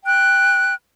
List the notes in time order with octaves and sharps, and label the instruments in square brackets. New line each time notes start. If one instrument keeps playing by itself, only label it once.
[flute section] G5 F#6